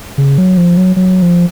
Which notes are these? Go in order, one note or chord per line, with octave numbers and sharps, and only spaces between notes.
C#3
F#3
F3
F#3
F#3
F3